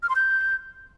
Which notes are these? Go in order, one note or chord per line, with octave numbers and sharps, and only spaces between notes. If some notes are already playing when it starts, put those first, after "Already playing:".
F6
C6
G6